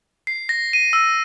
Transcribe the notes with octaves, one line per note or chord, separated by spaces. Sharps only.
C7
A#6
D#7
E6